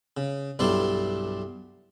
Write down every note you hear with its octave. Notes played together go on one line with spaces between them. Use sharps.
C#3
B1 G2 D4 E4 A4 C6